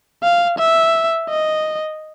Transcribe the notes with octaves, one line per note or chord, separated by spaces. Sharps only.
F5
E5
D#5